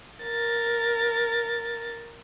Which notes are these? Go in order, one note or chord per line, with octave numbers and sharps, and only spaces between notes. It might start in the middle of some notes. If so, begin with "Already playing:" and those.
A#4 A6